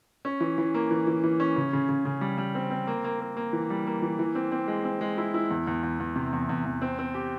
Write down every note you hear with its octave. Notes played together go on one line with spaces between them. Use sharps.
C#4
E3
E3
A#3
E3
E3
E3
C#4
C#3
C#3
C#3
C#3
G3
G3
C4
C4
A#3
A#3
A#3
A#3
E3
G3
A#3
E3
E3
C4
C4
G#3
C4
G#3
E4
E4
E2
E2
E2
E2
C3
E2
E2
E2
C4
C4
G4